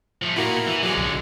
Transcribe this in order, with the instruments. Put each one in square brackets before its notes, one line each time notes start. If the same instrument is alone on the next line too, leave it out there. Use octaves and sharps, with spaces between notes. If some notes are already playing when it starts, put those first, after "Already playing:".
[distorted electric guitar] F3 A3
[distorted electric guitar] A#2 A#3 [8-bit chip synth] E4 F#4 A#4
[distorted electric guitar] E3
[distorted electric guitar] D3 G#3 [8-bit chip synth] F#3 G#4
[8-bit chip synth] B1